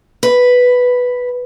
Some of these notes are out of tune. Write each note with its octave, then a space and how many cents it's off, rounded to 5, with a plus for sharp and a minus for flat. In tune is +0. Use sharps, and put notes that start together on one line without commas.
B4 +0